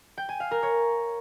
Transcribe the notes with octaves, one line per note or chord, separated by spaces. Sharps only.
G5
G#5
F5
A#4
C#5